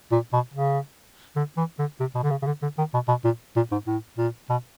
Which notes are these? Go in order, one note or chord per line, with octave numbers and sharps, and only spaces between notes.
A#2
B2
C#3
D3
E3
D3
C3
B2
D3
C#3
C#3
D3
D3
D#3
B2
B2
A#2
A#2
G#2
A2
A#2
B2